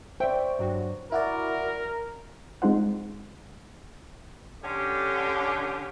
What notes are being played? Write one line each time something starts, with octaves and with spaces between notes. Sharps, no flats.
C5 D5 E5 G5 C#6
G2 F#3 F#4
E4 F#4 A#4 D5
G#3 C4 D#4 F4 C5 F#5
D3 C#4 G4